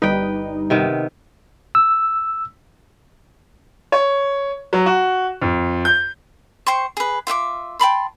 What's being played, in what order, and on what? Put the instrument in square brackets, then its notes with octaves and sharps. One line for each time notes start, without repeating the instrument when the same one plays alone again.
[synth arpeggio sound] G1 G3 D#4 [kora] B4 G5
[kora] C3 D#3 B3
[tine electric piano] E6
[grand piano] C#5
F#3
F#4
F2
G6
[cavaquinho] C5 G5 C6 C#6
G#4 B4
F4 E5 F#5 D6
G5 A5 B5 C6